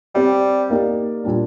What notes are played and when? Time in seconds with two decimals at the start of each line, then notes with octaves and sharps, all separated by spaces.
0.15 G3 C4 G4 D5
0.70 A#3 D#4 G4 D5
1.24 A#2 G3 D4